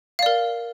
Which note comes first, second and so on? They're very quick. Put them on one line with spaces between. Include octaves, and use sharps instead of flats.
F5 D5 A#4